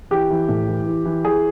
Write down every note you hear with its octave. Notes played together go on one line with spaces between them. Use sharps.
E3 G4
E3
A2
E3
E3
E3
E3 G#4